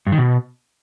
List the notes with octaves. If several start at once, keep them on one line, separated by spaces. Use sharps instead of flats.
G2
D#3
B2